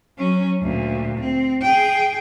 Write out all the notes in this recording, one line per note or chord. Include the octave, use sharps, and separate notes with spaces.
F#3 C#4
D2 A#2
C4
G#4 G5